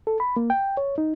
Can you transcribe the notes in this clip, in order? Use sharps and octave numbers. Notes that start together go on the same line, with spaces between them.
A4
B5
A#3
G5
C#5
D#4